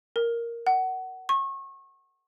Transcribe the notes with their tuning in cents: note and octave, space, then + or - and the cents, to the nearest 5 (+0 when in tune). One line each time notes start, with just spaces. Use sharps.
A#4 +0
F#5 +20
C#6 -30